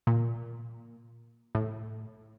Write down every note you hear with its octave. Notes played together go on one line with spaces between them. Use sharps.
A#2
A2